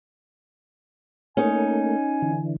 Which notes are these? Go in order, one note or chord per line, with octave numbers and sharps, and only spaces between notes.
A3 A#3 C#4 D#4 G#5
D3 E3